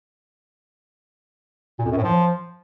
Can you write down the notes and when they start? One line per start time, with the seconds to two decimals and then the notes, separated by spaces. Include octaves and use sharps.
1.79 A#2
1.85 F2
1.91 F#2
1.97 A2
2.03 F3